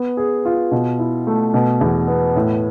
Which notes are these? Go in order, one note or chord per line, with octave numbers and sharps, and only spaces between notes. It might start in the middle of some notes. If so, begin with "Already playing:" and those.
Already playing: B3
G#4
F4
B2
E4
A3
B2
E2
B3
A2